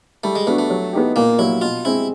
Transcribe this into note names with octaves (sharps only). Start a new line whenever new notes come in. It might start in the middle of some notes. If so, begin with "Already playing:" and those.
G3 A3
G#3
A3 B3 D4 F#4
A3
F#3
B3 D#4 G4
A#2 A#3
F#3 A#3 E4
B2 F4
G#3 C4 E4